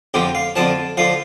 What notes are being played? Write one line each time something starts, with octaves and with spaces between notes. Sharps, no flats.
F2 D3 F3 G4
F5
F2 D3 F3 A5
D3 F3 F5